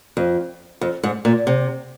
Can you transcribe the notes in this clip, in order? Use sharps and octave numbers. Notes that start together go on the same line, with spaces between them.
F2
F2
G#2
A#2
C3